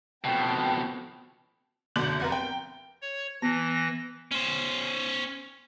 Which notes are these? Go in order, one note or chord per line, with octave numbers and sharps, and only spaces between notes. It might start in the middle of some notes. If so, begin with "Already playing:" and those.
F2 B2 G5 A5
F#1 B2 D3 G6 F#7
F1 B3 A#4
G5
C#5
E3 B3 A#6
C#4 C5